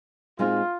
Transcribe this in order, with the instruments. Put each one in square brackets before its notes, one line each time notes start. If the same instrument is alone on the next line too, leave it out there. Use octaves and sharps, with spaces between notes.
[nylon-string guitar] A#2 G#3 C4 D#4 F#4 [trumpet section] F4